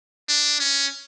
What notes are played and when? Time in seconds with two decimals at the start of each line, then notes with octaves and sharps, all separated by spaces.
0.29 D4
0.60 C#4